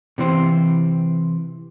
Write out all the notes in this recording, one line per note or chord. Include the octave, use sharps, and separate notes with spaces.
C3 E3 C4